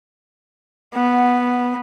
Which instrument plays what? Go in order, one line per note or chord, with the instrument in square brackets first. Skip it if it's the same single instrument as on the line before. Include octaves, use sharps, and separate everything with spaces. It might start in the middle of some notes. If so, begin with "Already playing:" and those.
[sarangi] B3 [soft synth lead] F#5